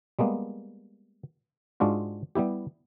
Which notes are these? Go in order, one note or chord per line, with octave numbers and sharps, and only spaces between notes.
G3 G#3 A#3 B3
G#2 G#3 D4 F4 F#4
G3 B3 E4 G4